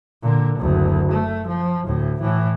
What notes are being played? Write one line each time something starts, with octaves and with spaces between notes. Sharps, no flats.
A#2 D3
F#1 D2
A3
F3
D2 A2
A2 E3